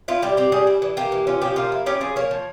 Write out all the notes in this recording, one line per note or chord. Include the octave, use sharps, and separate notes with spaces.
E4 F4
G3 G4
C4 G4
G3 G#4
E4
E3
A#3 G4
E3
C#4 F4
F3 G4
A#3 F4
E4
C#4 G4
F3 G#4
A#3 C#5
F3